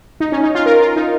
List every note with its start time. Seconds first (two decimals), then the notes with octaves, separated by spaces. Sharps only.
0.20 D#4
0.32 C#4
0.43 D#4
0.55 F4
0.66 A#4
0.81 F4
0.96 D#4